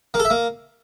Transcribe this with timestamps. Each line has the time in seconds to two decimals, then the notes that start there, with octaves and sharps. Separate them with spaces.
0.14 A#3
0.19 A4
0.25 E5
0.30 A#3